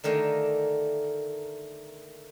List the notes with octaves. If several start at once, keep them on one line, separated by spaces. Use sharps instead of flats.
D3 D#3 A3 A#3